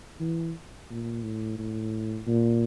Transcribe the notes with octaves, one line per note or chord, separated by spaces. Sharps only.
E3
A#2
A2
A2
A#2